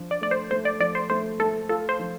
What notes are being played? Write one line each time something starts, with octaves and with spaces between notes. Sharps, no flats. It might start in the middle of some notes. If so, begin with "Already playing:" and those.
Already playing: F3 D4
D5
A3 D5
C5
A3 C5
D5
F3 D5
C5
A3 C5
A3 A4
F4 A4
C5
F3